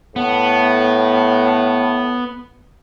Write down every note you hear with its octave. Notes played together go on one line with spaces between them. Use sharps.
A2 B3